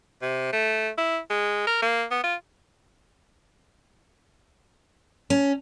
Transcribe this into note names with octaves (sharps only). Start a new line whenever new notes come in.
C3
A3
E4
G#3
A#4
A#3
B3
F4
C#4